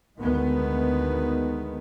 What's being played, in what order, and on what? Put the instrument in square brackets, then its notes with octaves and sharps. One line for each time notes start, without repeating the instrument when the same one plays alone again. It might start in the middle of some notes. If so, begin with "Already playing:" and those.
[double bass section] D2 D#3 G#3 B3